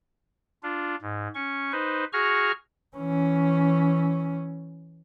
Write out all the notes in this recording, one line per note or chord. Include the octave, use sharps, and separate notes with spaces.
D4 F4
G#2
C#4 C#6
D#4 B4 C5
F#4 G#4 A#5 C#6 F6
E3 C#4